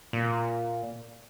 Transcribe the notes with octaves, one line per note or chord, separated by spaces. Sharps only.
A#2